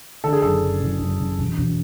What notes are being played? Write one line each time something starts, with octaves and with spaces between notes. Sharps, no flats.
D3 A4
G#4
F#1 A4
F#1
F#1
F#1
F#1
E1
E1